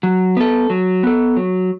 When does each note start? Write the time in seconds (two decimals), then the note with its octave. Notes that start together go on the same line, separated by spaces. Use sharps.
0.03 F#3
0.37 B3 A4
0.70 F#3
1.03 B3 A4
1.37 F#3